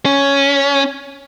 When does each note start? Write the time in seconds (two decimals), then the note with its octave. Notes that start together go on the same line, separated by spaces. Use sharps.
0.05 C#4